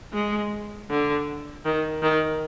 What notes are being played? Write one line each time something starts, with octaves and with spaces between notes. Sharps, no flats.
G#3
D3
D#3
D#3